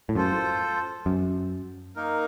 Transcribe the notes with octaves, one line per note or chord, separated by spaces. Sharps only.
A2
F#2 F4 A4 C5
F#2
A#3 D#4 A#4